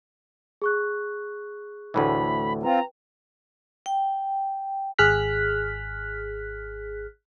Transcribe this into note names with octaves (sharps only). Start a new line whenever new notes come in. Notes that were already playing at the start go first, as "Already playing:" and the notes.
G#4 C#6 F#6
D2 A2 E3 B5
C4 F4 B4 G5 A#5
G5
G#1 G#4 F6 F#6 B6